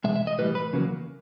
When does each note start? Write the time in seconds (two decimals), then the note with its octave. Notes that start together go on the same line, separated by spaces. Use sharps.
0.04 E2 B2 G#3 E5
0.16 E5
0.27 D#5
0.38 B1 A2 E3 G3 B4
0.55 B4
0.73 E2 C#3 F#3 A#3